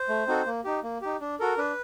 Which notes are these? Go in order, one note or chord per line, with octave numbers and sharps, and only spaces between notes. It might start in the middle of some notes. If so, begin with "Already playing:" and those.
Already playing: C5
A3
C4 D#4 F#4 A4
A#3
D#4 G4
A#3
D#4 G4
D4
F#4 A4 A#4
D4 B4